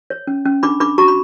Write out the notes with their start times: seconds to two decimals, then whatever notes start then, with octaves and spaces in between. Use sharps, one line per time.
0.10 C#5
0.27 C#4
0.45 C#4
0.63 D4 B5 D6
0.80 D4 B5 D6
0.98 F#4 A#5 C#6
1.08 B5